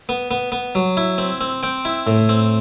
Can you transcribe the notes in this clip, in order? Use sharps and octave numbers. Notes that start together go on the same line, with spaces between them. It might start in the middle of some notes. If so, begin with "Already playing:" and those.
B3
B3
B3
F#3
E4
C4
C4
C4 G5
E4
A2
C4